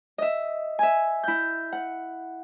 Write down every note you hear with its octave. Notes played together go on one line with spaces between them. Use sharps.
D#5 E5
E5 G#5
E4 G6
F#5